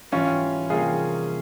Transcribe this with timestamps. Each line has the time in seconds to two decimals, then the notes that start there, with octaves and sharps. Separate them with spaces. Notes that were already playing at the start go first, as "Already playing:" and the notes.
0.12 G#2 E3 G3 C#4 F4
0.70 C3 G3 A#3 F4 G#4